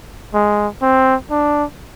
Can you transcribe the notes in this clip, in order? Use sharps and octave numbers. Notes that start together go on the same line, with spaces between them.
G#3
C4
D4